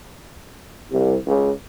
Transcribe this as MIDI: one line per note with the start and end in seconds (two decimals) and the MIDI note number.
0.91 1.16 36
1.27 1.51 37